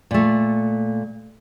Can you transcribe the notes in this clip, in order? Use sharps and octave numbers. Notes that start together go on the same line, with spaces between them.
A#2 A3